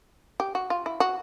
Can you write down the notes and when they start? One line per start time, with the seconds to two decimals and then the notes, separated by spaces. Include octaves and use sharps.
0.40 G4
0.55 F#4
0.70 F4
0.86 E4
1.00 F#4